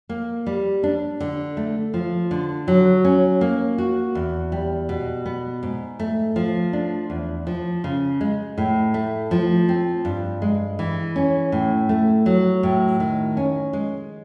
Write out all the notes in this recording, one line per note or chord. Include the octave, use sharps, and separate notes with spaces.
A#3
G3
D4
D3
A3
F3
D3
F#3
C#4
A#3
F#4
E2
G3
B2
B3
G#2
A3
F3
D4
E2
F3
C#3
G#3
A2
A3
F3
C4
G2
G#3
E3
C#4
A2
A3
F#3
A2
D#3
C#4
G#3